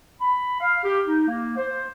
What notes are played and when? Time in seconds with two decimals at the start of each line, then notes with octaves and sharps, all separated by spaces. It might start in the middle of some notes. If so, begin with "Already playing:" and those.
0.21 B5
0.61 F5
0.83 G4
1.07 D#4
1.27 A#3
1.57 C5